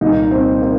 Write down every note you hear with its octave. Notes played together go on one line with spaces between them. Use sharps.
C2 A#2 A#3 D#4 D#5
C4 C5
A#3 A#4